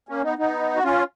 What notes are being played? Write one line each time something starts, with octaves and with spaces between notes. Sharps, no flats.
A#3 C#4
B3 D#4
B3 D#4
F#4
C#4 F4